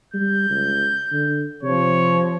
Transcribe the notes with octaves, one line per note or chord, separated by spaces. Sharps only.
G3 G6
C#2
D3
C3 F3 C#5